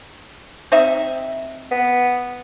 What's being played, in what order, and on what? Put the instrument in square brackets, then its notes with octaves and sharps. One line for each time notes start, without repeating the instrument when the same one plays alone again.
[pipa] C4 D#4 E5
[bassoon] B3